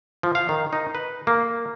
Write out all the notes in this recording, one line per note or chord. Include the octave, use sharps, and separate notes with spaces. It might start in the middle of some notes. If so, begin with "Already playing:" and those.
F3
F5
D#3
D#4
B4
A#3